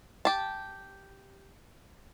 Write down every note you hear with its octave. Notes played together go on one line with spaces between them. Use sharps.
G4 A5